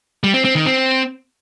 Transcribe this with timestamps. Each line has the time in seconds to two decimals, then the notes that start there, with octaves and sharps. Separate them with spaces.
0.23 G3
0.34 C4
0.45 C4
0.55 D#3
0.66 C4